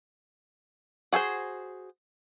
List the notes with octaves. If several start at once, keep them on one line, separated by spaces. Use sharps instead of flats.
F#4 G#4 A4 C5